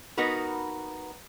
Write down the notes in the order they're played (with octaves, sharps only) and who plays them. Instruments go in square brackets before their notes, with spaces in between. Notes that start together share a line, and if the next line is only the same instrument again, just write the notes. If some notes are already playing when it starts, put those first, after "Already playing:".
[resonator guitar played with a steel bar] B3 D#4 F#4 A#4 B4